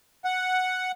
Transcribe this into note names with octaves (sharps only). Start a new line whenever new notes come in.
F#5